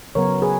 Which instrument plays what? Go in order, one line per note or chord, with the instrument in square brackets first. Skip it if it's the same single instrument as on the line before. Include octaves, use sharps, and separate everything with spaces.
[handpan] C#3 F#3 B3 A#4 C#5
G#4 B4